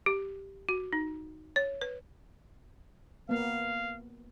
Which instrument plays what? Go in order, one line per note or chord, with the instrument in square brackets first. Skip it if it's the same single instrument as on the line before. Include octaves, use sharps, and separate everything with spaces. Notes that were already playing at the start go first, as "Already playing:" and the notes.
[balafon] G4
F#4
D#4
C#5
B4
[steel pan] A#3 B3 [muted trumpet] F5